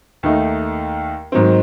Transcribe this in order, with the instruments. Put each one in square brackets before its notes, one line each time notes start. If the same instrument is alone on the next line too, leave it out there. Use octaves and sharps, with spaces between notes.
[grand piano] D#2 D#3 A3 D#4
G#2 D#3 F#3 C4